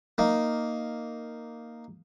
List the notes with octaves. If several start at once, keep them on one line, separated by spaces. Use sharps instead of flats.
A#3 D#4